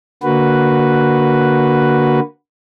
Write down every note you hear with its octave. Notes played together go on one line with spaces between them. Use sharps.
D3 A#3 F#4 B4